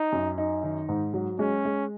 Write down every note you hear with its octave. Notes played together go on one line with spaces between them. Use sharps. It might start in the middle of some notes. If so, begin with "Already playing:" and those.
Already playing: D#4
F#2
D#4
D#3
G#2
F#3
G#3 C#4
G#3